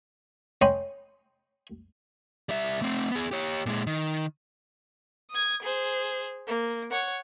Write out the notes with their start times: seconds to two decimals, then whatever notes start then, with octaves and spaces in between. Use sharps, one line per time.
0.61 C#4 D#5 G5 B5 C6
2.49 G3 E5
2.82 A3 C4
3.12 B3 G#4
3.31 G4 C#5
3.66 A#2 G#3
3.87 D#3
5.31 D#6 G#6
5.62 G#4 C5
6.48 A#3
6.91 C#5 F#5